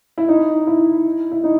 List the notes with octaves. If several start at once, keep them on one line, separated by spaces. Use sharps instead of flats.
E4
D#4
E4
E4
D#4